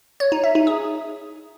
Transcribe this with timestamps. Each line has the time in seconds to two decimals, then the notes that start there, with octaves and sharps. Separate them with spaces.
0.20 C#5
0.32 D#4
0.44 E5
0.55 D#4
0.67 G#4